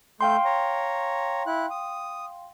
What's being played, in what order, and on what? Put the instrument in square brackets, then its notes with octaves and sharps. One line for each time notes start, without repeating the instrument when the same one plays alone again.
[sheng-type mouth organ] A3 G6 [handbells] F5 G5 C6
[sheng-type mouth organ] C#5 A#5
E4 F#6
D#6